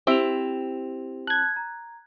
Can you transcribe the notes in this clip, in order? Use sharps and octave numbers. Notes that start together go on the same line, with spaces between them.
C4 E4 G4 F7
A5 F#6 G#6
A#5